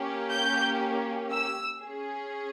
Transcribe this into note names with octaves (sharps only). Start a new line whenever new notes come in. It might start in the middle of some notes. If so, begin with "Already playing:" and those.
Already playing: A#3 C#4 G4
G6
E6
C#4 G#4